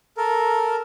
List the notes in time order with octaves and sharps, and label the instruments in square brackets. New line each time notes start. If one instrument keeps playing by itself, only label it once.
[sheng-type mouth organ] A4 A#4